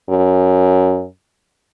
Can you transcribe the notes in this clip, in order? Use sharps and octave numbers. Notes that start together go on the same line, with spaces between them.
F#2